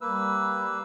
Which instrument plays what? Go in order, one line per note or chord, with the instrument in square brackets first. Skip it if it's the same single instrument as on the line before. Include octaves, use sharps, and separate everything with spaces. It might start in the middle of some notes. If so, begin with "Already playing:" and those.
[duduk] G3 [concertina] A#3 B4 E6